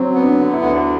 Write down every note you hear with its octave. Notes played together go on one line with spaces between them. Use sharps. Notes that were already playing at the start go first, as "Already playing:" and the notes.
Already playing: F#3 C4
B3
D4
D3
E4
D2